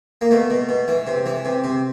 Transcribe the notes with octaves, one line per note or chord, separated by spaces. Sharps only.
A#3
B2 A3
B2
B2
E3
C3
E3
C3
C3